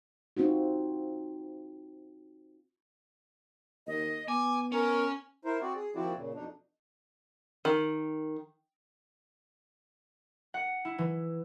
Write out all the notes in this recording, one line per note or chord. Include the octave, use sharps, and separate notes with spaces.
C4 D#4 F4 F#4
D#2 D#5
B3 G#5 D6
C#4 A#4
E4 A#4 C5
C4 F#4 D5
G#4
D#2 F3 C4 E4 F#4 D5
A#2 C#3
F2 B2 D4 D#4
D#3
F#5
E4
E3